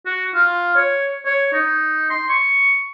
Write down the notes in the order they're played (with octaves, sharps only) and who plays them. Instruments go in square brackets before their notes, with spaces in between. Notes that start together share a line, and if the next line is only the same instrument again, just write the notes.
[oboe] F#4
F4
C#5
C#5
D#4
C6
C#6